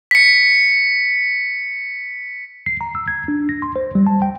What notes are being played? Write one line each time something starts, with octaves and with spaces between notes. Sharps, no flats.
B6 C#7
C7
A#5
E6
G#6
D4
A#6
C6
C5
G3
A5
G5